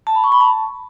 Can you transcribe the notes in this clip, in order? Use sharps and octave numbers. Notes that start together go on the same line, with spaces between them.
A5
B5
C#6
B5
A5